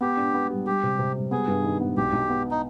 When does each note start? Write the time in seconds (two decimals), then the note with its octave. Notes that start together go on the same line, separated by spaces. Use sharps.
0.01 B3 G4
0.17 D4
0.34 B3
0.50 G3
0.66 G3 G4
0.83 C3
0.99 C3
1.15 G3
1.31 B3 G#4
1.48 G2
1.64 D#3
1.80 B3
1.97 B1 G4
2.13 B1
2.30 B3
2.51 D#4